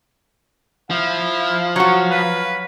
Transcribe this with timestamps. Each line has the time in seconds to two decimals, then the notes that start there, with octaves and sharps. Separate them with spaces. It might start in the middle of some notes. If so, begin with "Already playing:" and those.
0.91 F3 E4 F5
1.76 F#3 F#4 C#6
2.11 B4